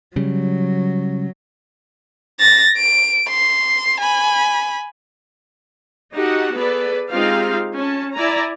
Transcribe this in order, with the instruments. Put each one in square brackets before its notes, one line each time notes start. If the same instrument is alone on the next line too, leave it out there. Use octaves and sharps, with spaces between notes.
[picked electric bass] C#3 G3 [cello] F#3
[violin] A6 A#6
D7
C6
G#5 B5
[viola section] D#4 F#4 G4 A4 F#5
B3 G#4 A4 B4 D5
G#3 C4 D#4 F4 G4 F5
C#4 A5
E4 D5 G#5 A#5